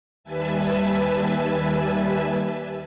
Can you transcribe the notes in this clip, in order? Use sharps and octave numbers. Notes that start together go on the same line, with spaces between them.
D#2 G3 B4 E5 G#5 A5